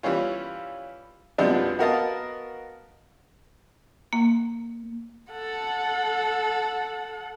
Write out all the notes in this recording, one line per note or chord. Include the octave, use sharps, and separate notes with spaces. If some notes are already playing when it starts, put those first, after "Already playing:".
E3 G3 C#4 F4
F#2 C3 F3 G#3 B3 D4
B3 F#4 A#4 D#5 F5 A5
A#3
A4 F#5